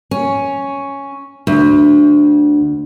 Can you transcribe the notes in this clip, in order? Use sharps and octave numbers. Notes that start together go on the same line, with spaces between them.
C#4
D2